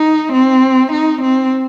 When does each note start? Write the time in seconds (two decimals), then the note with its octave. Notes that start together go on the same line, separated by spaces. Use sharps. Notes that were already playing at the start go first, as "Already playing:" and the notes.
Already playing: D#4
0.33 C4
0.92 D#4
1.22 C4